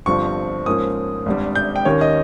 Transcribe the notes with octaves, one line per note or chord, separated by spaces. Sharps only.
G1 G2 F3 C4 C#6
G#2 F3 A#3 C#4 D#6
G#1 G2 G3
G6
G5
D#2 D#3 A#3 C#4 C#5
D#5